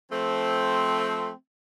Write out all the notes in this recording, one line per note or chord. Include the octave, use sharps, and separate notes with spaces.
F3 A3 C4